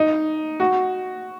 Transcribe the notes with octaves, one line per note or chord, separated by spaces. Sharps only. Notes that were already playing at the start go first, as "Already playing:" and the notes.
Already playing: D#4
F#4